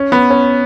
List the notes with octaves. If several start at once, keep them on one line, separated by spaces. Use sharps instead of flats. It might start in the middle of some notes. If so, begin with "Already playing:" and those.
Already playing: C#4
B3
C#4